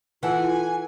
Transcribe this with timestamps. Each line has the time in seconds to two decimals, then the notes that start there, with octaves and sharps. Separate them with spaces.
0.23 E3 F4 A4 F#5 G#5